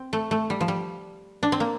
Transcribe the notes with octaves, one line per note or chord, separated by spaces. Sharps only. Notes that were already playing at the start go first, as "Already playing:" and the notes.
Already playing: C4
A3
A3
G3
F3
G3
D4
C4
A#3